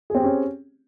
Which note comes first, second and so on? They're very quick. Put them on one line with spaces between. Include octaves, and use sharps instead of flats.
G#4 C4 G4 C#4